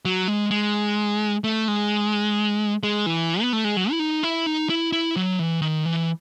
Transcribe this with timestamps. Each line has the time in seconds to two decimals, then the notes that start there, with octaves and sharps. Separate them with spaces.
0.05 F#3
0.28 G#3
0.51 G#3
1.44 A3
1.68 G#3
2.83 G#3
3.06 E3
3.41 B3
3.53 A3
3.64 G#3
3.77 F#3
3.91 E4
3.99 D#4
4.23 E4
4.46 D#4
4.70 E4
4.92 E4
5.16 F#3
5.39 E3
5.61 D#3
5.86 E3